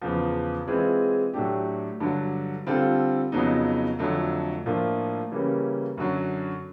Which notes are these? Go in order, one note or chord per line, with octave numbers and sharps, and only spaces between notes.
E2 C#3 F3
E3 G#3 C4 F4 G#4
A2 F#3 A3 D4 G4
G2 D3 F#3
D3 G3 C4 F4 A4
F2 C#3 F#3 B3 D#4
F2 D3 F#3 A3
A2 F3 A#3 D4 F4
C#3 E3 G3 A#3 C#4
F#2 D3 F#3